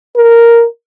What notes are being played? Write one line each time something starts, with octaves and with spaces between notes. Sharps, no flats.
A#4